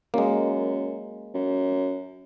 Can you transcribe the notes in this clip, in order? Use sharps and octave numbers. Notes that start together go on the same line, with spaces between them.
F#2 G#3 A#3
F#2